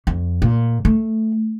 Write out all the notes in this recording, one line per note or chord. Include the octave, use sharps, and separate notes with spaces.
F2
A#2
A3